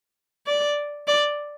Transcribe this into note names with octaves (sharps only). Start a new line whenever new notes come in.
D5
D5